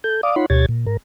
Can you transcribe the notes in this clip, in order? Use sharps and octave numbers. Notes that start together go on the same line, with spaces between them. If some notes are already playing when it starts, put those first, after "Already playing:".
A4 G6
D5 F5 D6 D#6
D#4 F4 C#5 F#5 B5 C6
D2 B2 G4 C#5 G#6 A6
A#2
G#2 A#4